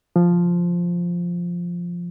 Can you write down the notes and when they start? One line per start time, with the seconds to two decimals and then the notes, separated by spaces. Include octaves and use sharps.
0.16 F3